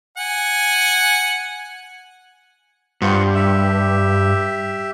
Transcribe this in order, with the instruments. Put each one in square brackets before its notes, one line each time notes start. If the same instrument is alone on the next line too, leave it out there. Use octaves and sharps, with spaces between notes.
[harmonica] F#5 G#5
[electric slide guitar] G2 [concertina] F4 C5 F#5
[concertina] G4 E5